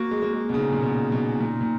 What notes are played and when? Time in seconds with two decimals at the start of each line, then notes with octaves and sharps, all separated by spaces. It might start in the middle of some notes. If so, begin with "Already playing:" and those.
Already playing: A#3 F#4
0.11 G#3
0.22 A#3
0.34 G#3
0.49 B2
0.54 C#3 D#4
0.72 A#2
0.83 B2
1.12 B2
1.40 A#2
1.61 A#2